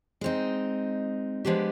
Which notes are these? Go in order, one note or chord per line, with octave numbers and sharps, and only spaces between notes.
G#3 C4 D#4
F3 G#3 B3 D4 G4